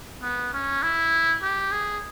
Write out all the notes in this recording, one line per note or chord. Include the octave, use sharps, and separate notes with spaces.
B3
C#4
E4
G4
G#4